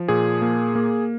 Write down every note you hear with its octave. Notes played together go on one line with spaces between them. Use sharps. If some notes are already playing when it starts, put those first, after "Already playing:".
Already playing: F3
A#2 G#4
A#3
A#3